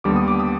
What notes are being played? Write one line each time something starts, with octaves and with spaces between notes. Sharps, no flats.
D#2 D3 G3 B3 D6
D#6
D6
D#6